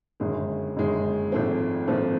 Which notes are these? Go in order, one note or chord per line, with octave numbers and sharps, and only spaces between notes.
G1 F#2 D#3 G#3
G1 F#2 D#3 G#3
G#1 G#2 F3 A3 C4
G#1 G#2 F3 A3 C4